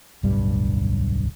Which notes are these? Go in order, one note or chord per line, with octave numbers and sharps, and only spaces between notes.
D1 B1 G2 G3